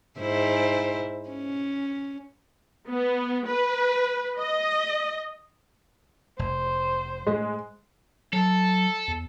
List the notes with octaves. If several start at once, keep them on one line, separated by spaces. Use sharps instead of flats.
G#2 E4 C5
C#4
B3
B4
D#5
F1 C5
A2 G#3
F#3 A4
E2